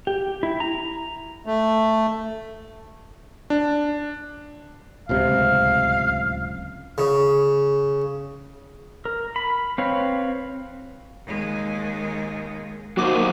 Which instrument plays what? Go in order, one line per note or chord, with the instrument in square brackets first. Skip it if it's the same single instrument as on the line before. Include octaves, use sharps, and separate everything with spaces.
[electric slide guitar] G4
E4
A#5
[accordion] A3
[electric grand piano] D4
[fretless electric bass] D1 C#2 C3 [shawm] F5
[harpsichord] C#3
[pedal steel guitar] A#4
B5
C4 B4 C#5 F5
[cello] D#2 G#3
[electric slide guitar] F#3 D#4 C5 [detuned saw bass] A#3 [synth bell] F#4 D6